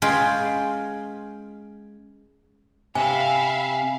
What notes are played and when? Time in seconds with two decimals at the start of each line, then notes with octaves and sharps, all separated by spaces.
0.02 G#3 C#4 F4 G#4 B4 G5
2.95 C3 E5 F5 G#5 B5